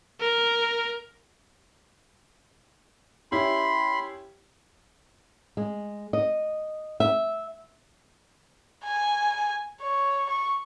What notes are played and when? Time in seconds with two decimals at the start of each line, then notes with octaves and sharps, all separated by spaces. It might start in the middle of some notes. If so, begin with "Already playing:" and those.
0.21 A#4
3.32 C#4 E4 G4 B5 C6
5.57 G#3
6.13 D#5
7.00 E5
8.84 G#5
9.82 C#5
10.29 C#6